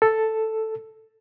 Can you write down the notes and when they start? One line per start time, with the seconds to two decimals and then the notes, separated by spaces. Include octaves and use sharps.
0.02 A4